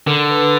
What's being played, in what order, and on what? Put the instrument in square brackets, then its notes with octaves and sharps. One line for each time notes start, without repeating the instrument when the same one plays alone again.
[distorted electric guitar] D3 [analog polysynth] A#4
[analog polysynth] B4